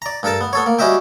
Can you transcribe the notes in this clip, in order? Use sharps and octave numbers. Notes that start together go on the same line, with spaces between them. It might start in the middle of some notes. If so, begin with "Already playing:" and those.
D5 A#5
G2 A4 A#4 A5
B3
B3 A4 C#5
A#3
G3 C#4 F#4 D#5 E5 G5